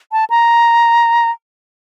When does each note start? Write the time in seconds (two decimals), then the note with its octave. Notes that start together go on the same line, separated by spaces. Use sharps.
0.12 A5
0.30 A#5